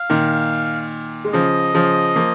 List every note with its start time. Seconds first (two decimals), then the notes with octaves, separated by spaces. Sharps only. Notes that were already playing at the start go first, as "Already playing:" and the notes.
Already playing: F5
0.10 A#2 D#3
1.25 G#3
1.33 C#3 F3 D#5
1.74 C#3 F3
2.16 F3 A#3